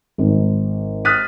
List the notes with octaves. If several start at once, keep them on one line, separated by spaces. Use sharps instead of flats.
G#1
D#6 F6 F#6 A6 B6 D#7